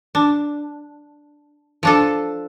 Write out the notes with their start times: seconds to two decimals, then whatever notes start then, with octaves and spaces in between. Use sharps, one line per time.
0.15 D4
1.83 F3 D4 A4